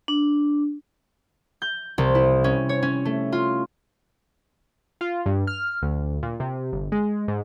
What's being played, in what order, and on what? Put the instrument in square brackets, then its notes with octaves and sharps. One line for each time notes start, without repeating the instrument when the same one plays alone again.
[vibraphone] D4
[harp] G6
C2
E4
C#4
C#5
C#4
A3
F4
[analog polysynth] F4
G2
F6
D2
A#2
C3
G1
G#3
G#2